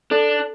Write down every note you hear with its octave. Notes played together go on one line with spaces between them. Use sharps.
D4 A4 A5